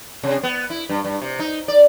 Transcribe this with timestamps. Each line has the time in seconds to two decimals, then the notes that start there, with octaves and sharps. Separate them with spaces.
0.23 C3
0.43 B3
0.70 E4
0.89 G2
1.05 G2
1.22 C3
1.39 D#4
1.68 D5